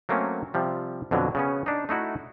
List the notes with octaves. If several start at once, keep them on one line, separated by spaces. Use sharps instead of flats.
F#3 A3 A#3 C4 C#4
C3 F3 G3
F2 B2 D3 F#3
C#3 B3 C#4
D4 D#4
A3 D#4 E4 F#4